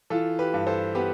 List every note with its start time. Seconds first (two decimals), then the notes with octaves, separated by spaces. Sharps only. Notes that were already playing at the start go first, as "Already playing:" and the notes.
0.10 E3 F4 A4
0.39 G4 B4
0.54 G2
0.67 A4 C5
0.95 B3 G4 B4